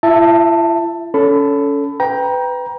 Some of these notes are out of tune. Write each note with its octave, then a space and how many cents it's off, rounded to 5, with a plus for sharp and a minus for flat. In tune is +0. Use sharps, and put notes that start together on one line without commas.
E4 +45 E5 +0 A5 +15
C#4 +25 A4 +0 B5 +25
B4 +20 G5 +5 A#5 +25